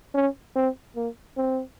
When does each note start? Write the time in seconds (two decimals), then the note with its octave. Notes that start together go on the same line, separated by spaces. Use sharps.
0.15 C#4
0.56 C4
0.96 A#3
1.37 C4